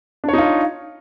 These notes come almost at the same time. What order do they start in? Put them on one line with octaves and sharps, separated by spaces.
D4 C#5 D#4 F4